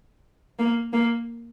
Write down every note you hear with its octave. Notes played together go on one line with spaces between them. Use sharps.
A#3
A#3